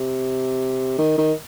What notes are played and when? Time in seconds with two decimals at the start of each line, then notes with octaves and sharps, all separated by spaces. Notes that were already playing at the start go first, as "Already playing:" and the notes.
Already playing: C3
0.98 D#3
1.17 D#3